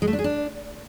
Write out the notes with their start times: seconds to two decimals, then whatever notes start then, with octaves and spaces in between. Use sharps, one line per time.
0.02 G#3
0.07 A3
0.13 D4
0.19 G#4
0.24 D4